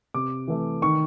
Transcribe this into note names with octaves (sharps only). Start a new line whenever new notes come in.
C3 D6
E3 A3
D#3 C#6